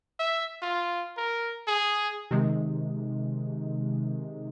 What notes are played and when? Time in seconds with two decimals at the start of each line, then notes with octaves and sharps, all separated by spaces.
0.19 E5
0.62 F4
1.17 A#4
1.67 G#4
2.31 C3 D#3 G#3